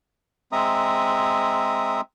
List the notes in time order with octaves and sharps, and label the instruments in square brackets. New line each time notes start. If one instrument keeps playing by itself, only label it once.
[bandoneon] G#3 C4 E5 A#5 D#6